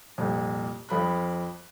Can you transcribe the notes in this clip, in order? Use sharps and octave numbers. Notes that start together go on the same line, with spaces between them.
C2 F2 A#2
F2 F3 B5 F#6